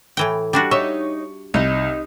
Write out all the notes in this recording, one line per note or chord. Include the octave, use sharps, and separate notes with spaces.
A2 E3 G5
G3 D4 F#4
D#4 C#5 E5 C#6
C2 D#4 D#5